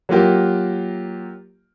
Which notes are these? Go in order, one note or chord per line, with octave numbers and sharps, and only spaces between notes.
F#3 A#3 F4 G4